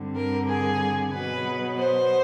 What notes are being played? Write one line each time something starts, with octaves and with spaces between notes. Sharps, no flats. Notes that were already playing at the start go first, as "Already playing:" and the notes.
Already playing: G2 D3 G3 C4
A#4
G#4
B2 F#3 B3 B4
C5